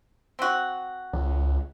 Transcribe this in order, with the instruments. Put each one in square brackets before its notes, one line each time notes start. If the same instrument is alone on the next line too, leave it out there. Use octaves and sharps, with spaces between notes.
[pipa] C4 F#4
[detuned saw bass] C#2